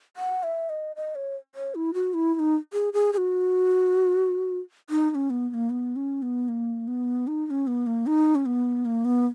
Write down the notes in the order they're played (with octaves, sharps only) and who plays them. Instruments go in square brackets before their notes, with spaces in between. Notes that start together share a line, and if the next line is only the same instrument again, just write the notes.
[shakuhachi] F#5
E5
D#5
D#5
C#5
C#5
E4
F#4
E4
E4
D#4
G#4
G#4
G#4
F#4
D#4
D#4
C#4
B3
B3
A#3
B3
C#4
B3
A#3
B3
D#4
D#4
C#4
B3
A#3
D#4
C#4
B3
A#3
B3